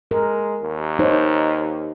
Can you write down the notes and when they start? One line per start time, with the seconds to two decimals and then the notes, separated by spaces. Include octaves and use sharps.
0.11 G#3 A#4
0.61 D#2
0.99 D#4 C5 C#5